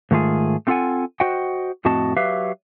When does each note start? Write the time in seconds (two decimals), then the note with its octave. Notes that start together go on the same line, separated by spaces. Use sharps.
0.11 G#2 D#3 A3 F4 G#4
0.67 A3 C4 F4 A4 F#5 G#5
1.20 F#4 C5 D#5 F#5 G5
1.85 F2 A2 C4 F#4 D#5 A5
2.17 F#3 G4 B4 E5 F5